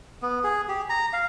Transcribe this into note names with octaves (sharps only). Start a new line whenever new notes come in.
B3
G#4
G4
A#5
F5